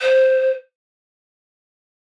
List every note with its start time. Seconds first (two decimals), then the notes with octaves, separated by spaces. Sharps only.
0.01 C5